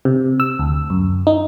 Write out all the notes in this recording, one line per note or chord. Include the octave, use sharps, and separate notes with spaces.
C3
E6
D2
F#2
D#4